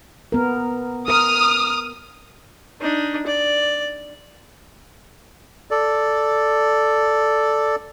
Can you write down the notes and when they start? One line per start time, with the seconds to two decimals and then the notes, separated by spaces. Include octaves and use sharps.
0.32 B3 A#4
1.08 A#4 D#6 F6
2.81 D4 D#4
3.26 D5
5.71 A4 D5